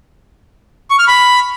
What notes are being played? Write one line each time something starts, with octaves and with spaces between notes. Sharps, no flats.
C#6
F6
B5